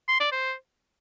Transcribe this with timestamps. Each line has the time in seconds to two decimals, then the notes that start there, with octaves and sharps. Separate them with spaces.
0.08 C6
0.20 D5
0.32 C5